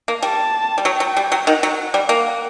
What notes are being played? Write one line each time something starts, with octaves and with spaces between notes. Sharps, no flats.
A#3
G3 A5
G3
F#3 G5
F#3
G3
F#3
D#3 F#5
F#3
G3
A#3 F#5